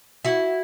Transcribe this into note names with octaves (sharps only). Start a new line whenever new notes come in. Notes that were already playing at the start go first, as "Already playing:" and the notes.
E4 F#4